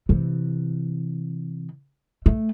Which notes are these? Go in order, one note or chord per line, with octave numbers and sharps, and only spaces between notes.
C3 E3
A3